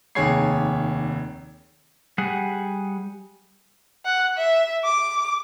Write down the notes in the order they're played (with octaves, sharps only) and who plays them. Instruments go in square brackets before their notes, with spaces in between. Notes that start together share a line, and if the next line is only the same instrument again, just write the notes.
[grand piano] F1 D#2 G#4 C#5 G#6 C7
[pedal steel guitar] G3 G#4 F#5
[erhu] F#5
E5
D6